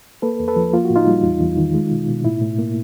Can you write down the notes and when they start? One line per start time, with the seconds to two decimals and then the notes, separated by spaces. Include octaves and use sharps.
0.22 A#3 A4 B4
0.40 E2
0.48 A4 B4
0.56 F3
0.73 A#3 F4
0.85 F#4
0.90 A2
0.96 D#4 F4
1.07 G3
1.24 E2
1.41 E2
1.57 D#3
1.74 G#3
1.91 B2
2.08 B2
2.25 A2 E4
2.42 A2
2.58 A#3